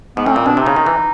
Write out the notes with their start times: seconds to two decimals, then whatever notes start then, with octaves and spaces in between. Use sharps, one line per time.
0.17 G#2 B3
0.26 A2 C#4
0.32 A#2 C4
0.46 B2 D4
0.57 C3
0.61 D#4
0.66 C#3
0.76 D#3
0.86 E3